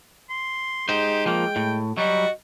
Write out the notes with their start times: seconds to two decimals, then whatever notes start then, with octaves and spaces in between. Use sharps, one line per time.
0.30 C6
0.89 G#3 D#4 G4 C5
1.26 F3 A#3 G5
1.56 A2
1.97 F#3 G3 F#4 D#5